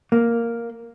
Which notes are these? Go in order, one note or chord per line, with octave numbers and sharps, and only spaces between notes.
A#3